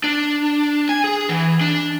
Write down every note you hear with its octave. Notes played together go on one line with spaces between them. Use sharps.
D4
G#5
G#4
E3
D4